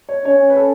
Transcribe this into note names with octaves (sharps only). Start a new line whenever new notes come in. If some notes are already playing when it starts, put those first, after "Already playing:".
C#5
C#4 C#5
B4
A4